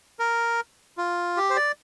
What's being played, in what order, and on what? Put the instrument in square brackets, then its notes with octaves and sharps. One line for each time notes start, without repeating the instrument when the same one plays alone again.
[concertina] A#4
F4
G4
C5
D5